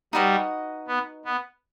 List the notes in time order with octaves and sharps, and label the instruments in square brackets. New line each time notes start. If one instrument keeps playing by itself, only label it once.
[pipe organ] G3 [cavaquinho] D#4 F#4 B4 D#5
[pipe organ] B3
B3